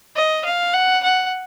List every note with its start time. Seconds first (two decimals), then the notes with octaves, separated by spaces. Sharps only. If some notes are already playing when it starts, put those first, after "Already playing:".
0.16 D#5
0.44 F5
0.73 F#5
1.04 F#5